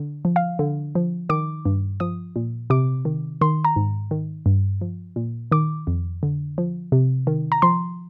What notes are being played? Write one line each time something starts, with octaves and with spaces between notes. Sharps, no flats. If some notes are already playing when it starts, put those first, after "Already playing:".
Already playing: D3
F3
F5
D3
F3
D#3 D6
G2
F3 D#6
A#2
C3 D6
D#3
D#3 C6
A#5
G#2
D#3
G2
F3
A#2
D#3 D6
F2
D3
F3
C3
D#3
A#5
F3 C6